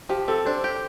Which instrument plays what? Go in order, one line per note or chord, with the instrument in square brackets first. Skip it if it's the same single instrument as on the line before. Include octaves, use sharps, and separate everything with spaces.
[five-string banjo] F3 [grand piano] G4
[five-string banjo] C4 [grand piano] A4
[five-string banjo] D4 [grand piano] C5
[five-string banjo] G4